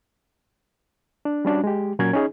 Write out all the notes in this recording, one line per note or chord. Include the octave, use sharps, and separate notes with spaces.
D4
G3 C#4 D4 F#4
G#3 G4
A#2 F#3 C#4 A#4 G#6
C#4 D#4 G#4